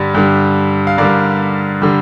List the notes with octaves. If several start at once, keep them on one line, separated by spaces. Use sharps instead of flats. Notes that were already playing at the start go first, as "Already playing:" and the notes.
Already playing: G2 D3 G3
G2 D3 G3
F5
G2 D3 G3 A#4 D5
D3 G3